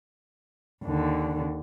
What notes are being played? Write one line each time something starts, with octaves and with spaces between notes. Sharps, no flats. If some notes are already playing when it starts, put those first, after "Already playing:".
D#2 D3